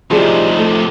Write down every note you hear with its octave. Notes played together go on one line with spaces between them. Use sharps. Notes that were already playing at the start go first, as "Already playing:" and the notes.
A2 C3 F3 G3 D#4 G#4
A3